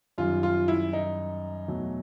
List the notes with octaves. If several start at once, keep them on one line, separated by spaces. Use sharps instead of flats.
F#2 D#3 G3 F4
F4
E4
D#4
E2 B2 F#3 A3